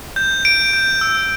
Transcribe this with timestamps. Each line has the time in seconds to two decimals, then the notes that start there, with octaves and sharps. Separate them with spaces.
0.16 G6
0.45 G6 D7
0.73 G6
1.01 E6